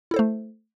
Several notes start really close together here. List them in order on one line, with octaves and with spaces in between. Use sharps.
E4 A4 C5 A3